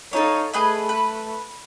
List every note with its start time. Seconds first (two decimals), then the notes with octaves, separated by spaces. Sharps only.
0.13 D#4 A4 C#5 F5
0.53 A3 G#4 B4 D#5
0.89 B4